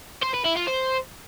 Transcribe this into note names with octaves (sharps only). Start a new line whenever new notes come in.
C5
B4
E4
F4
C5